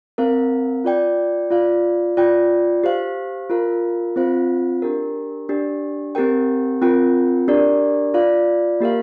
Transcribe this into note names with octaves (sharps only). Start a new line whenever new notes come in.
C4 A#4 F5
F4 D5 G5
F4 D5 F5
F4 D5 G5
G4 C5 F5
F4 A#4 F5
C4 F4 C5 F5
D4 G4 A#4
D4 G4 D5
C4 G4 A#4 G5
C4 F4 A#4 G5
D4 G4 A#4 D5
F4 D5 F5
A#3 G4 A#4 F5